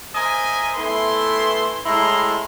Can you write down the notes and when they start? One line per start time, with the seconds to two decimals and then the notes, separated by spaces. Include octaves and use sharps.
0.15 A#4 C5 D#5 E5 G#5
0.75 E3 A3 B3 E4 C6
1.85 A2 G#3 E4 A#5 C6